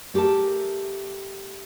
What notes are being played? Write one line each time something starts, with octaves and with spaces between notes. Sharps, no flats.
A3 G4 G#4 A#4 A5